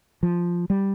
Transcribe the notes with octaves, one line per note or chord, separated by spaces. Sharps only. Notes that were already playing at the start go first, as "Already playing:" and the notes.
F3
G3